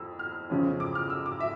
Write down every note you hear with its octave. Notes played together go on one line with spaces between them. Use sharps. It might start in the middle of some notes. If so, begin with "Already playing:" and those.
Already playing: F2 E6
F6
F2 C#3 F3 C#4
D6
F6
E6
D6
E5